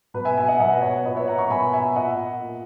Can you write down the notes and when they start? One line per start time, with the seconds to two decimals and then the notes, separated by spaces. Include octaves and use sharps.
0.14 B2 B4
0.25 E5 G#5
0.37 E5 G#5
0.48 D#5 F#5
0.55 G#5
0.59 B2 D#5 F#5
0.82 C#5
1.05 A#2 B4 D#5
1.16 C#5 E5
1.27 F#5 A#5
1.38 A#5 C#6
1.50 B2 G#5 B5
1.73 E5 G#5
1.96 A#2 D#5 F#5
2.41 A#2